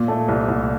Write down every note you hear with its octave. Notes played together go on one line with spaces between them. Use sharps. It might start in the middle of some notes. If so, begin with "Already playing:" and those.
Already playing: A#2
A3
C2
C2